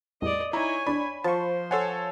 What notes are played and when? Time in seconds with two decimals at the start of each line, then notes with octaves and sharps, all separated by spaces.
0.22 E2 A2 G3 D5 D#5
0.53 D#4 E4 C#5 G#5 A#5
0.87 E2 D4 D5 B5
1.24 F3 C5 A5 C#6
1.71 A4 C#5 F#5 G#5 A5 C6